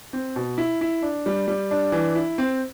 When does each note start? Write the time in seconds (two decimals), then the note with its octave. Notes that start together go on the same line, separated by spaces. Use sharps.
0.13 C4
0.36 B2
0.58 E4
0.81 E4
1.02 D4
1.26 G3
1.48 G3
1.71 D4
1.92 E3
2.15 E4
2.38 C4